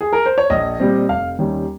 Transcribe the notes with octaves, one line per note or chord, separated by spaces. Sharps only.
G#4
A#4
C5
C#5
A#1 D#5
A#2 G3 C4
F1 F5
D#2 D#3 G3 C#4